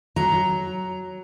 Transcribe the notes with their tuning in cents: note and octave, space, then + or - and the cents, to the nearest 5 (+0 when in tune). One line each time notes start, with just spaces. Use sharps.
F#3 +0 A#5 +0